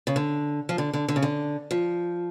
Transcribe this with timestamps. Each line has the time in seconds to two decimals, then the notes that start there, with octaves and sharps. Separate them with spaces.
0.07 C#3
0.16 D3
0.69 F3
0.78 D3
0.93 D3
1.08 D3
1.16 C#3
1.23 D3
1.71 F3